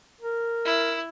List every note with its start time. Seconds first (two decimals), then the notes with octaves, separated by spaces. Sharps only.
0.21 A#4
0.65 E4